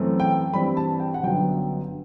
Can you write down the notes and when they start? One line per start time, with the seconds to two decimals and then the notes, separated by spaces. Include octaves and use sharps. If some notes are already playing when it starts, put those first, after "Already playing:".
Already playing: F#2 E3 A3 C4
0.20 G5
0.53 G2 E3 G3 C4 B5
0.77 A5
1.00 G5
1.14 F#5
1.23 G1 F#2 D3 F#3 B3 G5